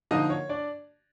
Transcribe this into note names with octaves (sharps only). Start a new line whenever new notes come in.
D3 F3 A#3 D#4 D#5
C#5
D4 D5